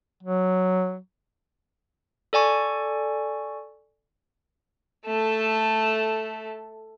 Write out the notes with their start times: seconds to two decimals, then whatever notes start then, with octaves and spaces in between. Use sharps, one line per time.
0.23 F#3
2.33 A4 D5 G#5 C#6
5.06 A3 A4